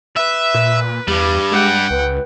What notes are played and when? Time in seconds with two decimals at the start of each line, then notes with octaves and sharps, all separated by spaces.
0.16 B4 E5
0.54 A#2
1.07 E2 G2 G3 G4
1.52 G#3 F#5 G5
1.91 C#2 B4